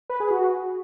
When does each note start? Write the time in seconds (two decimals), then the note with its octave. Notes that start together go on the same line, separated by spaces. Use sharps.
0.10 B4
0.20 G#4
0.31 F#4